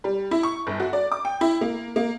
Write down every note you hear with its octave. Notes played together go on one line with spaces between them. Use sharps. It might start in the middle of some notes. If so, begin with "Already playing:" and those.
G3
E4
C#6
G1
F#4
D5
D6
G5
E4
A#3
A#3